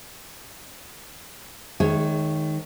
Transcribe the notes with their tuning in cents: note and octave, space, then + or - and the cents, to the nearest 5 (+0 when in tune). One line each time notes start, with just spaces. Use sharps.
D#3 +0 G#3 +20 C#5 -5